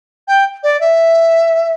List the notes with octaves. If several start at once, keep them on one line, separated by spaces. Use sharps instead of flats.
G5
D5
E5